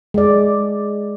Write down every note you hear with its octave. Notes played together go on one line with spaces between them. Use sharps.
G#3 D5